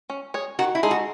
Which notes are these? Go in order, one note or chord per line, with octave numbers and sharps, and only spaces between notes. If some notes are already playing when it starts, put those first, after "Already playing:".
C#4
G#4 C#5
D#3 F#4
E4
G#3 D#4 G#4 A4
F#4